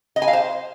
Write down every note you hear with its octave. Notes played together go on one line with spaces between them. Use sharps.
D#5
G#5
F5
C5